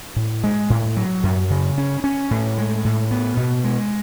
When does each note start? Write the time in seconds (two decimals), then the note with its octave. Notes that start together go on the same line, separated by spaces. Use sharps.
0.16 A2
0.44 G#3
0.70 A2
0.97 F#3
1.23 F#2
1.50 C#3
1.78 C#4
2.04 C#4
2.31 A2
2.58 G#3
2.85 A2
3.11 B3
3.37 B2
3.64 G#3